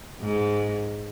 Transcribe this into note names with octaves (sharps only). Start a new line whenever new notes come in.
G#2